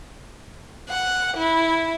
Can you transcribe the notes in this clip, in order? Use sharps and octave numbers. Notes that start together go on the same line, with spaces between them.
F#5
E4